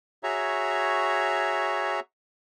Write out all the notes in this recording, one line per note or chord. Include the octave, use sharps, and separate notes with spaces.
F#4 G#4 C#5 E5 A#5